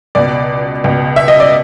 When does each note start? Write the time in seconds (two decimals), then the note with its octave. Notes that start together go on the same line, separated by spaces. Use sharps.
0.15 C#2 B2 D5
0.84 C#2 B2
1.16 E5
1.28 D#5
1.40 D5